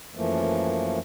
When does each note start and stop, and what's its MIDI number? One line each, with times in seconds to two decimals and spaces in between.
0.15 0.99 42
0.15 0.99 52
0.15 0.99 53
0.15 0.99 57
0.15 0.99 58